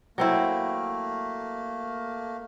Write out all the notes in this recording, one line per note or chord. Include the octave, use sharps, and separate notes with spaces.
F#3 A3 A#3 C4 E4